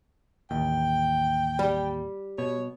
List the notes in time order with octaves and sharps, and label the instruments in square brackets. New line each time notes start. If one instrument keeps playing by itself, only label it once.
[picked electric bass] A1 D#2 [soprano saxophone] G5
[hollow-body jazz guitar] G3
[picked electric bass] B2 [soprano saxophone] C#5